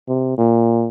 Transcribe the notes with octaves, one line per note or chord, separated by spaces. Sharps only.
C3
A#2